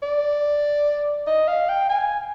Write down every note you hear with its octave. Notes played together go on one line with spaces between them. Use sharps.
D5
D#5
F5
G5
G#5